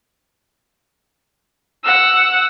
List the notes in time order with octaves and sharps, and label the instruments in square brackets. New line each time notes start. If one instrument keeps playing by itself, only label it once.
[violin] F#5 E6